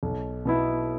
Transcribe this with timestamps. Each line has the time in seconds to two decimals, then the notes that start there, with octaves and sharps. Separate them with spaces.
0.03 B1
0.45 B2 B3 E4